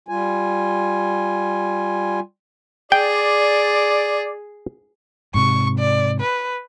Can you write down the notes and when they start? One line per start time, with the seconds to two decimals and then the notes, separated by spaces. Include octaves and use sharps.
0.08 G3 F4 G#5
2.92 G#4 D5 G5
5.34 G#2 C3 C#6
5.79 D5
6.21 B4